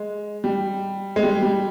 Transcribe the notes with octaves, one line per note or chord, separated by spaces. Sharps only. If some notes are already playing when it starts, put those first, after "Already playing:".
Already playing: G#3
G3
G#3
G3
G3